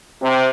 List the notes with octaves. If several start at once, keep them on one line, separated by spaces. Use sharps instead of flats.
C3